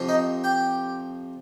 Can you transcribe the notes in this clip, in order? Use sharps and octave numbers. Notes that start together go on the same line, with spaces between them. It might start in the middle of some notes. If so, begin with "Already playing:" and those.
Already playing: F2 C3 F3
D#4 D#5
G4 G5